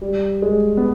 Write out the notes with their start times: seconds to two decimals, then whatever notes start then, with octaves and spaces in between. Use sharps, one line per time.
0.01 G3
0.42 G#3
0.77 B3